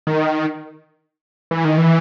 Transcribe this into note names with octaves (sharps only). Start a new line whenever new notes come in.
D#3
E3
D#3
E3